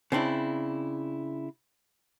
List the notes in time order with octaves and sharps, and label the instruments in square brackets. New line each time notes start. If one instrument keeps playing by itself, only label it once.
[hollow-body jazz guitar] C#3 C4 D4 E4